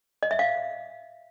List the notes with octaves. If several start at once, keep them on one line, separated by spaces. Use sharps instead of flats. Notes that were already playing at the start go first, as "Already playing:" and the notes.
D#5
E5
F5